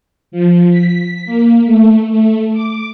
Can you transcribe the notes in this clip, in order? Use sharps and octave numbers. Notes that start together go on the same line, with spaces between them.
F3
B6
A#3
A3
A3
D6